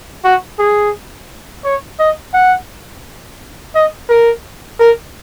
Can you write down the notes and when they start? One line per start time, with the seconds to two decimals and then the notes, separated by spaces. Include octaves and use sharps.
0.24 F#4
0.59 G#4
1.64 C#5
1.99 D#5
2.34 F#5
3.75 D#5
4.09 A#4
4.80 A#4